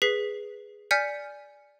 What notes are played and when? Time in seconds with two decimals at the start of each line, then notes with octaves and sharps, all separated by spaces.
0.02 G#4 B4 B6 C7
0.91 D5 G#5 F6 G6 B6 C#7